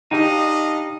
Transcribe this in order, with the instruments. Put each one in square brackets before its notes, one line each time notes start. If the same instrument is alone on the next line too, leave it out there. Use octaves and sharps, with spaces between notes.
[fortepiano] D#3 [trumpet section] D4 D#5 F5 [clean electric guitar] D#4 [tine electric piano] G4 G5 A#5